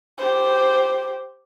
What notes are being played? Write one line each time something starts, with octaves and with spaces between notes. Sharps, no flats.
G4 C5